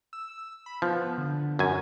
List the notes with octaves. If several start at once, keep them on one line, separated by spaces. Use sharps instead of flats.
E6
B5
F3 B3
D3
F#2 G#5